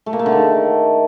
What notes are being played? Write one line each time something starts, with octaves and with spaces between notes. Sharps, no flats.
A3
A#3
A3
D3
D#3